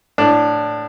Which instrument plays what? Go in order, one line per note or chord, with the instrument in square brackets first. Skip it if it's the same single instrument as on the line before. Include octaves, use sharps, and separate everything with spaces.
[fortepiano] A2 D4